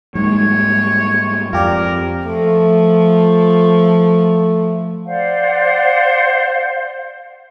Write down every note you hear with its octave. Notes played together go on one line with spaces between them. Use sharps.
G#2 G3 G#3 A#3 C#5
F2 F4 G4 A#4 D5
F3 A3
C5 D5 F5 F#5